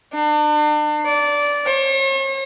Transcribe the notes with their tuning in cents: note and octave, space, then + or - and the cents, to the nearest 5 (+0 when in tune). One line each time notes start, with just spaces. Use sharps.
D4 +40
D5 -15
C#5 -45